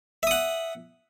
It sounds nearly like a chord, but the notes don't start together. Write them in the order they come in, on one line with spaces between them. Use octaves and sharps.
E5 D#6 F#5